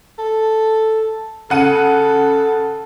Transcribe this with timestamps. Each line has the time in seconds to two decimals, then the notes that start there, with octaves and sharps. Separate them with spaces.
0.18 A4
1.50 C#3 A4 F#5 D#7